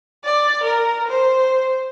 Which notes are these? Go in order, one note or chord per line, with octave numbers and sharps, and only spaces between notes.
D5
A#4
C5